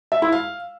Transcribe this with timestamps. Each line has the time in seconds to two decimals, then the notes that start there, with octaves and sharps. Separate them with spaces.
0.12 E5
0.22 E4
0.32 F5